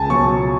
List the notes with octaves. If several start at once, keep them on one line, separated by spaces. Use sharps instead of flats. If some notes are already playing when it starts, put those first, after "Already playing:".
Already playing: C#2 G#5 A5
B2 F#3 C#6